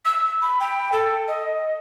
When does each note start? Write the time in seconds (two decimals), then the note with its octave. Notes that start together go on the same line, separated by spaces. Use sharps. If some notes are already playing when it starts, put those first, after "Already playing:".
0.06 E6
0.42 B5
0.60 G5
0.92 A4
1.28 D#5